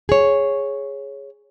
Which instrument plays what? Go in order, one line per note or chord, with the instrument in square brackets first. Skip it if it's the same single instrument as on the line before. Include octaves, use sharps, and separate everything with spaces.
[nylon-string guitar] G#4 C#5